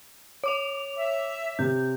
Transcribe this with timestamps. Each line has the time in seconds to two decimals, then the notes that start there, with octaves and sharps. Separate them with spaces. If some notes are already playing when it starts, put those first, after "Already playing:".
0.44 C#5 D6 F7
0.96 E5
1.59 C3 G6